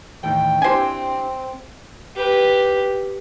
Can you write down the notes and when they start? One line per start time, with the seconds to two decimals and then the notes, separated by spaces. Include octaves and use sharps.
0.24 D#2 A2 E3 G5
0.62 C4 D4 E4 G4 C5 G#5
2.16 G4 B4